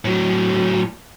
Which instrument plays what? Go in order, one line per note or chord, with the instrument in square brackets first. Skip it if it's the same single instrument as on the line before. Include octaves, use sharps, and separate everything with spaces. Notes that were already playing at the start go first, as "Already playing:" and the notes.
[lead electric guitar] A2 F#3